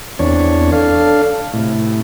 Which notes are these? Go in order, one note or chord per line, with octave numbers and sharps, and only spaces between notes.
E2 C4 D4 C#5
D4 A4 F5
A2 C3